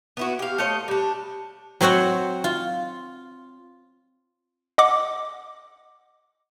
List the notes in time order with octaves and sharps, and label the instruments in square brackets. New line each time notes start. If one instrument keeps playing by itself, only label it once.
[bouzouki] B3 E4 F#4
G4 F5
A3 C5 C#5 D#5
G3 D4
[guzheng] F#3 C4 F#4 C#5 F#5
F4
[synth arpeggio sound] D#5 F#5 D6